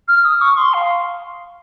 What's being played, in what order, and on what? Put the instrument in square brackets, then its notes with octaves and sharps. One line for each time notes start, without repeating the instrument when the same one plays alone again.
[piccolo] F6
D#6
C#6
C6
F5